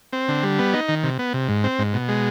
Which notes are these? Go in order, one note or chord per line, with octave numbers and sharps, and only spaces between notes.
C4
D3
G3
B3
D#4
D#3
C3
B3
C3
G#2
C4
G#2
B2
G#3